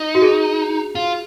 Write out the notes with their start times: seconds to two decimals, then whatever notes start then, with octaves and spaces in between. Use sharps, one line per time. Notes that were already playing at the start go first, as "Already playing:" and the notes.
Already playing: D#4
0.15 F#4
0.22 G#4
0.95 F4